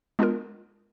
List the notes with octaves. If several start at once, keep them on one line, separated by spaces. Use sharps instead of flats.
G#3 B3 D4 F4 A#4